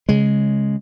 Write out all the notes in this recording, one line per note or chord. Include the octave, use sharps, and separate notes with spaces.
C#3 G#3